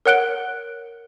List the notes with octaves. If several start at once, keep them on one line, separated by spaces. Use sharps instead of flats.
A#4 C#5 F#5 F#6 D7 G7